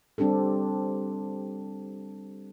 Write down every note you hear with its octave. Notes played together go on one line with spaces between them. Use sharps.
G3 C4 D4 G4 A4